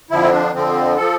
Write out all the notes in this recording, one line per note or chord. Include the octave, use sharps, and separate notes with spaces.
F2 D3 F3 E4
C4
D4
F2 D3 F3 C4
F3 A4